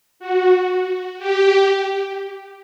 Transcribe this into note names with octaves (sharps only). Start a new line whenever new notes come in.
F#4
G4